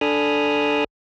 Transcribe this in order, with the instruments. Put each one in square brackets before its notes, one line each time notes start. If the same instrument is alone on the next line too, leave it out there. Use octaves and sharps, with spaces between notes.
[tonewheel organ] D4 A4 G#5 B5 D#6 F6